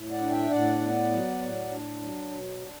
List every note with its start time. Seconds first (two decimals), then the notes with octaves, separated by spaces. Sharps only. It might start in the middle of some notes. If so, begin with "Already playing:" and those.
Already playing: A2
0.11 D5 F#5
0.20 D4
0.30 E5 G5
0.50 A2 D5 F#5
0.81 B3
1.10 F#3
1.41 A2
1.71 D4
2.01 F#3
2.30 B2
2.60 D4